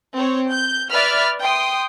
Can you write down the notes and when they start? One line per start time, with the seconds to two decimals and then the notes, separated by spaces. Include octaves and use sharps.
0.16 C4 C#5
0.51 G6
0.91 B4 D5 E5 B5 F6
1.40 G5 C6 D#6